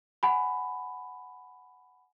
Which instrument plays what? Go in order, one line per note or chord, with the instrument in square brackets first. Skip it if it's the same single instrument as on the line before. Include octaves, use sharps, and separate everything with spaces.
[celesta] F#5 G#5 B5